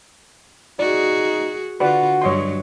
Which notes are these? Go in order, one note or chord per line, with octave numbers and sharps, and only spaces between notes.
D#4 F#4 G#4 D5
D3 F4 F#4 B4 D5
G2 F#3 C#5 D#5 C6